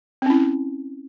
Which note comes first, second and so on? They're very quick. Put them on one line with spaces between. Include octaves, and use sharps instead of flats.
C4 C#4 E4